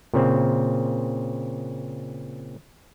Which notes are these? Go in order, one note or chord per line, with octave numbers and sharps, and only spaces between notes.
A#2 C#3 C4